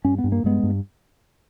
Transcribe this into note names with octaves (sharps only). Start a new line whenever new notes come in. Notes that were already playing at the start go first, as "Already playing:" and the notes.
G2 C#4
B3
G2
A#3
G2 G#3 B3
G2